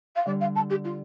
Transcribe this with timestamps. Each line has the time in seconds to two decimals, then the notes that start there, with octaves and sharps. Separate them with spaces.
0.16 F5
0.26 D3 G3 D5
0.40 F5
0.55 A5
0.69 G4
0.84 F4